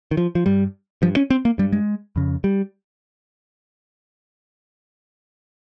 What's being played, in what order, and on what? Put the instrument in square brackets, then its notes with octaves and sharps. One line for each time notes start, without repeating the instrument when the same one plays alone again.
[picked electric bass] D#3
F3
F3
G2 G3
G2 F3
C#4
C4
A#3
G2 G3
G#3
F2 C#3
G3